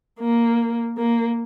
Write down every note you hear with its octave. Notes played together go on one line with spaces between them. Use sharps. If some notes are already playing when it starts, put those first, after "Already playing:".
A#3
A#3